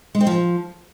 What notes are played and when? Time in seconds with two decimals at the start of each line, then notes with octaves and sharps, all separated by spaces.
0.15 G#3
0.21 C4
0.27 F3